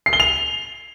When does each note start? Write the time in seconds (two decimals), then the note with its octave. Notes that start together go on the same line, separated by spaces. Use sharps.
0.06 C7
0.13 G7
0.20 F7